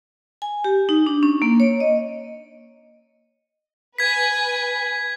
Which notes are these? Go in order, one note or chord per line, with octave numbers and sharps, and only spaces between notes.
G#5
G4
D#4
D4
C#4
A#3
C#5
D#5
B4 G#5 G#6 B6